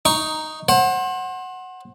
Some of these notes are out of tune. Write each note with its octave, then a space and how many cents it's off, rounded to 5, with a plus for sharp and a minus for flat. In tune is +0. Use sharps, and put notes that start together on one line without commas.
D#4 +0 C#6 +0
C5 +30 F#5 +0